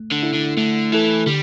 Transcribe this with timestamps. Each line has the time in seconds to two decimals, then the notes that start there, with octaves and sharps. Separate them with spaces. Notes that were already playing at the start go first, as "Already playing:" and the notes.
Already playing: A3
0.12 D3
0.23 E4 A4
0.35 D3
0.57 D3 A3
0.92 E3 E4 A4
1.27 D3 G3